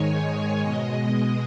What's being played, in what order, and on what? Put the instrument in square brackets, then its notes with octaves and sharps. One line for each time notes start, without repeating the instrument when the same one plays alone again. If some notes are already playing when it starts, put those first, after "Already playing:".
Already playing: [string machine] G#2 D#3 G#3 C#5 G#5
C#5
B2 G#3 D#5
D#5